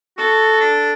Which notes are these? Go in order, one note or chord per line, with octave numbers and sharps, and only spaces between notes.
F#4 A4
D4